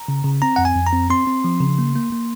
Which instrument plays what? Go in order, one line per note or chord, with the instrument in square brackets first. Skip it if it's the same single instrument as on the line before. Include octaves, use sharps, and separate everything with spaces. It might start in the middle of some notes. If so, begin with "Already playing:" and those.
Already playing: [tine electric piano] A#5
C#3
C#3
C4 A#5
F2 F#5
G#5
F2
A#5
C4
C4 C6
C4
F3
C#3
A#3
A#3
A#3